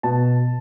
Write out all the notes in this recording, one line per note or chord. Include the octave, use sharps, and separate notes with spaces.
B2 A5